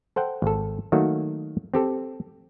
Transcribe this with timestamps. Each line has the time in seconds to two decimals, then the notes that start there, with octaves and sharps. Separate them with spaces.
0.16 A4 C5 F#5 G5
0.42 G#1 A4
0.92 D#3 F#3 A3 A#3 F#4
1.74 C4 G4 A4